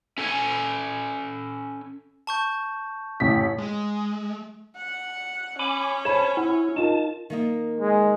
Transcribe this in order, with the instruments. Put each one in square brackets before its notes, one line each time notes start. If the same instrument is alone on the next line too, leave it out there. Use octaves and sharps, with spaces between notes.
[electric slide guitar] C#4 A4 F#5 G#5
[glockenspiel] A5 C#6 G6
[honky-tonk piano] A1 B6
[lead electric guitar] G#3
[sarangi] F#5
[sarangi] C#4 [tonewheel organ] G#5 B5 D6
[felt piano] C5 B5 [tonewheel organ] C#5 A5
[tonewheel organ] E4 [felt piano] F#5
[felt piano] D#4 F4 A#4 [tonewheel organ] A5
[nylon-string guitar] D#3 A#3 D#5
[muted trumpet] G#3